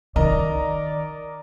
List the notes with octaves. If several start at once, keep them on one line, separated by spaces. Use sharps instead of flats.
D#3 A#4 D5 D#5 A#5